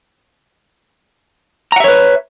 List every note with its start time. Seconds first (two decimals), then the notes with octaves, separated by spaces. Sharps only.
1.72 A#5
1.76 F#5
1.80 E5
1.84 C#5
1.88 B4